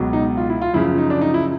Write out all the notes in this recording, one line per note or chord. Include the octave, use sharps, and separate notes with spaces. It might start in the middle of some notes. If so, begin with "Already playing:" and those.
Already playing: C#2 B2 F#3
D#4
F4
E4
F4
F#2 C#3 F3 E4
D#4
D4
D#4
E4